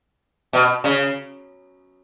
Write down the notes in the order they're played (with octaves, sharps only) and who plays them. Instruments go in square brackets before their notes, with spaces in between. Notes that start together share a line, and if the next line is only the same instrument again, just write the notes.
[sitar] B2
C#3